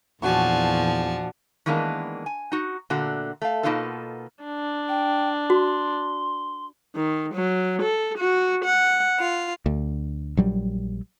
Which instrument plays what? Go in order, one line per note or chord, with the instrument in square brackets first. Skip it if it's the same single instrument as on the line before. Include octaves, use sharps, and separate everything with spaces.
[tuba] E2 [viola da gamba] A#2 F3 [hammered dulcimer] D4 F#4 C#6 [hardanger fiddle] G#5 A5
[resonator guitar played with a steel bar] D#3 E3 G#3 A#3 B3 D4
G#5
D#4 F#4
A#2 D3 A3 F#4
A3 F5
B2 A#3 B3 D#4 F4 A4
[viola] D4
[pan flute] G5
[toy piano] F#4 [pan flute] C6
[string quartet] D#3
F#3
A4
F#4
F#5
F4
[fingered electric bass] D2
A#1 F#3 G3